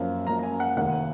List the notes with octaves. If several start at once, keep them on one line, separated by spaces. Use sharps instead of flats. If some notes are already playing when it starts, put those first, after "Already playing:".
Already playing: F#2 F3 A#3
F#2 F3 A#3 A#5
A#5
G#5
F#5
F1 D#2 D#3 A#3 F#5